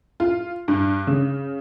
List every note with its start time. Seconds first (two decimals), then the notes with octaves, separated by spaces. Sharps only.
0.20 F4
0.68 G2
1.07 C#3